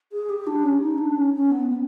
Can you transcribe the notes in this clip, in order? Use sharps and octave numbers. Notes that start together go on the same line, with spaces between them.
G#4
G4
D4
C#4
D#4
D4
C#4
C#4
B3
B3